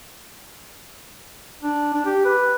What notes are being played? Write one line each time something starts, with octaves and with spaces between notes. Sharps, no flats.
D4
D4
G4
B4